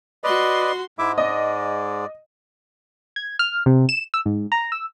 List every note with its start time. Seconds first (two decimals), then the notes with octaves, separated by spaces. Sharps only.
0.24 F#4 B4 D5 D#5 C6
0.99 G#2 G#3 E4 E5 D6
1.18 D5 D#5
3.16 G#6
3.39 F6
3.66 C3
3.89 E7
4.14 E6
4.26 G#2
4.52 A#5
4.72 E6